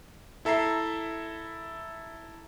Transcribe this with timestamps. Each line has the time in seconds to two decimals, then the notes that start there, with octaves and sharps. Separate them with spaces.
0.45 E4 A4 E5 A#5 C7